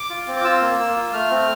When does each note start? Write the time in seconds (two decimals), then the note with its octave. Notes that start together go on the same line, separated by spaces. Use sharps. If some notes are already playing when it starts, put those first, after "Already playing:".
Already playing: D6
0.10 F4
0.27 C4
0.37 D6
0.44 F4 E6
0.61 A#3
0.79 A#3
0.96 F4
1.13 A3 F6
1.31 C4